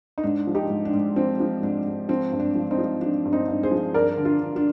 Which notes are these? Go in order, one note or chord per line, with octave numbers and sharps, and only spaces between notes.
D#4
G#2 D4
F3
D#4 G4
G#2
D4
G#2
F3 C4
F3
G#2 D4
G#2
F3 C4
G2
D4
F3
C4 D#4
F3
F3 D4
G2
C4 D#4
G2
G#4 C5
F3
G2 A#4 D5
D3
D4 F4
D3
D4 F4